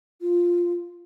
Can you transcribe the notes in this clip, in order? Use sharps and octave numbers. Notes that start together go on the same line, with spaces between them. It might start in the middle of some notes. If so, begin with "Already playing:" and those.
F4